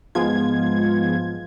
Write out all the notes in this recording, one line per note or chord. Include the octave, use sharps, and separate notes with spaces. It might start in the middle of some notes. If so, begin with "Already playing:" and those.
G#2 F3 G#3 B3 F4 G#6